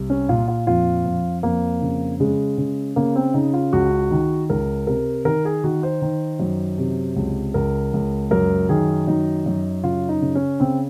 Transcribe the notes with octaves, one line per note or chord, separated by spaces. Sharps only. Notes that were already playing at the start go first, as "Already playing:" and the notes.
Already playing: C2
C#4
A#2 F4
F4
F2 F4
F2
F2 A#3
C#3
C#3 G#3
C#3
C#3 A#3
C4
C#3 D#4
F4
C#2 F#4
D#3
C#2 A#4
C3 A#4
D#3 A#4
G#4
D#3 F#4
C5
D#3
F#2
C3
C#2
C#2 A#4
C#2
F#2 A#4
D#3 G#4
F#2 D#4
F#2
C#3 F4
D#4
C#3
C#4
C#3 C4